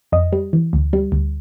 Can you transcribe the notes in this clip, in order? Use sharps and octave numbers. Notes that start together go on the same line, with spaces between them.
F2 D#5
G3
E3
D2
G3
D2